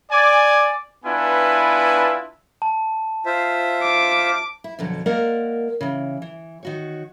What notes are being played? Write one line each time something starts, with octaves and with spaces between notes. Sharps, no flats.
D5 G#5
B3 D4 E4 F4 B4 G#5
A5
F4 C5 E5
D6
E4
F2 B2 D3 F#3
G#3 A#3 A#4 D5 F#5
C#3 E3
E3
D#3 F#4 C#5